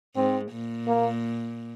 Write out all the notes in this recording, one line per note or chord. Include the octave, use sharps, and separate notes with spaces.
G#2 C4
A#2
A#3